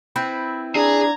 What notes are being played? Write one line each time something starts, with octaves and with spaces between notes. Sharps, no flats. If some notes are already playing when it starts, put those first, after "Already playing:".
C4 E4 B4
D4 G#4 A#5 G#6